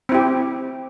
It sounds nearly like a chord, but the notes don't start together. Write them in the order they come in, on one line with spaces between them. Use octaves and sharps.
C4 E4 G4